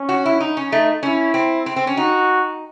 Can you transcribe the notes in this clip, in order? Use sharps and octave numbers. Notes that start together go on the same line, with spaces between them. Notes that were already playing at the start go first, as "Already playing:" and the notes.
Already playing: C#4
F#4
E4
D#4
C#4
A3 D#4
C#4 E4
C4
C4
C4
C#4
D#4 F#4